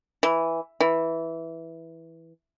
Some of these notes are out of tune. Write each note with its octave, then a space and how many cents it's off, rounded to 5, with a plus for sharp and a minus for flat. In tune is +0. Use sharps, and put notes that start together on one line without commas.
E3 +0
E3 -5